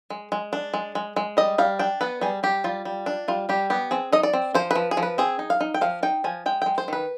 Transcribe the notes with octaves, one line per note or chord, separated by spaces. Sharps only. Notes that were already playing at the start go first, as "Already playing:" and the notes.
G#3
G#3
D4
G#3
G#3
G#3
G3 D#5
G3 F5
D4 G5
B3 B4
G3 G#4
G3 G4
G3 F4
G3
D4
G3 F4
G3 G4
B3 G4
C4 G#4
D#4 D#5
D5
C4
F3 C5
F3 B4
G#4
F3
B4
C4 G#4
D#4
F5
D#4
G5
F3 F5
D#4 G5
F3 G#5
G#3 G5
G#3 G5
C5
D#3 B4